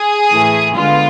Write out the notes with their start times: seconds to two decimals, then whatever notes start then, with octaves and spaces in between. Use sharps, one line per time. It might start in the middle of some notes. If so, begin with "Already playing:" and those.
Already playing: G#4
0.31 A2 E3 A3
0.75 D3 G#3 B3 F4